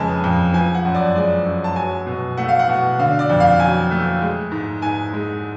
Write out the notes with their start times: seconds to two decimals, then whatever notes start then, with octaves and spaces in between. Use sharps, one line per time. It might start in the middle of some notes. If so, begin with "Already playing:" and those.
Already playing: F2 C#3 G#3 B4 G#5 A5
0.24 F2
0.53 F3 G#5
0.75 F#5
0.85 F#2
0.95 D5
1.15 G#3 D5
1.45 F#2
1.64 A5
1.76 F#3 G#5
2.06 B2
2.37 A3 F#5
2.48 F5
2.59 F#5
2.69 B2
2.99 D3 F5
3.19 D5
3.29 F2
3.40 F5
3.60 F#3 G#5
3.91 A3
4.21 G#3
4.51 G#2
4.82 G#2 G#5
5.13 G#3